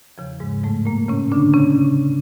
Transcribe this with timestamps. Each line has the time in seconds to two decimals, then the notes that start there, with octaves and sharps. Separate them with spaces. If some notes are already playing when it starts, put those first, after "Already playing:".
0.18 E2 C#3 F3
0.40 G#2 G#3
0.63 A2 A3
0.85 A#2 A#3
1.09 C#3 C#4
1.32 D3 D4
1.54 C#3 C#4